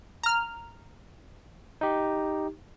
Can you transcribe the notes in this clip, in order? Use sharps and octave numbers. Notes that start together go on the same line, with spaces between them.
A#5 F6
D#4 G4